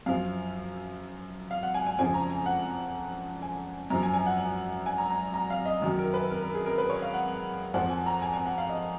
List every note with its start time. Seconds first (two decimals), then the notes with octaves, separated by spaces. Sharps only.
0.06 F#2 F3 F5
1.51 F5
1.63 F#5
1.74 G#5
1.87 G#5
1.99 F2 C#3 F3 G#5
2.14 A#5
2.30 G#5
2.46 F#5
3.42 G#5
3.90 F#2 F3 A#5
4.03 G#5
4.14 G#5
4.26 F#5
4.38 G#5
4.86 G#5
4.98 A#5
5.10 A#5
5.34 A#5
5.50 F5
5.66 D#5
5.82 F#2 D#3 F#3
5.98 A#4
6.14 B4
6.30 A#4
6.42 A#4
6.55 G#4
6.66 A#4
6.78 B4
6.90 C#5
7.02 F5
7.14 F#5
7.74 F2 F3 F#5
7.90 G#5
8.06 A#5
8.22 G#5
8.34 G#5
8.46 F#5
8.58 F5
8.70 D#5